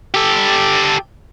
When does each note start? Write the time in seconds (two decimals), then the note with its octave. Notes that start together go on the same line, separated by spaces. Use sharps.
0.14 G4 A4